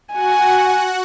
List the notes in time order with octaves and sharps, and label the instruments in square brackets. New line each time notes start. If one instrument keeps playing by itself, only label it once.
[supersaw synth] F#4 F#5 [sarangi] G#5